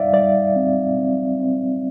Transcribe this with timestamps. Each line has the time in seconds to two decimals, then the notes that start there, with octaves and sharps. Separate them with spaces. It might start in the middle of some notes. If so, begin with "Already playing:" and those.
Already playing: G3 D#4 D5 E5 F5
0.13 G3 D5
0.56 C4
0.97 C4
1.40 C4